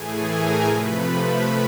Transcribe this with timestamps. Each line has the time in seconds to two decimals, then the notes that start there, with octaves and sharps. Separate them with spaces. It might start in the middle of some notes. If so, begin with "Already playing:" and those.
Already playing: A2 E3 A3 G#4 G#5
0.27 A#4 A#5
0.66 C3 F3 A3 B4 B5
1.06 B4 B5